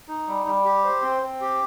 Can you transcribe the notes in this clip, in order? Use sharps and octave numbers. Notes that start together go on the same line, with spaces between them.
D#4
G3
G3
G4
C5
C4
C4
G4